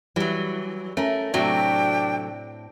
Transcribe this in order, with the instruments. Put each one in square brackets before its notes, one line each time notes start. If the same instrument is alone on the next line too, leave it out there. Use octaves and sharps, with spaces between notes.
[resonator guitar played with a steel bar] E3 F#3 [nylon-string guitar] G3
[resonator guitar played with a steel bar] A3 A#4 [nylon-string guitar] C#4
[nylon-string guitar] A2 C4 F#4 [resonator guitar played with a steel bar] C3 F#3 A3 [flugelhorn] D4 [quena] G5